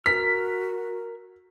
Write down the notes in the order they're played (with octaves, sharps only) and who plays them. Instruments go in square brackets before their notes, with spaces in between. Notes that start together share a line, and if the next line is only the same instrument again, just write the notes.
[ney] F#4 [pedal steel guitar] A#4 F6 [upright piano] B6